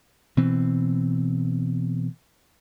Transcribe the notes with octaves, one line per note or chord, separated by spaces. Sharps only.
B2 E3 C4